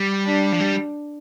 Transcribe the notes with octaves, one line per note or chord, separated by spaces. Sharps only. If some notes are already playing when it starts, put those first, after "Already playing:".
Already playing: G3
D4
F3
G3